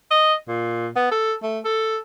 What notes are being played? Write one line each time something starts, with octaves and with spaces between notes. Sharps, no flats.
D#5
A#2
B3
A4
A3
A4